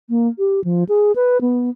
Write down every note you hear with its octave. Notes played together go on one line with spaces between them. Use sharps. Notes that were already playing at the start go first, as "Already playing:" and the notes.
A#3
G4
F3
G#4
B4
B3